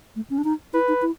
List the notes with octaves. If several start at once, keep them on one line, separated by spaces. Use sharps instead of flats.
A3
C#4
D4
D#4
E4 B4
D#4
E4